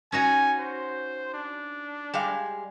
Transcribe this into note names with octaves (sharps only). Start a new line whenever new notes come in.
C#4 D#4 F#4 G#5
C5
D4
G3 G#3 F5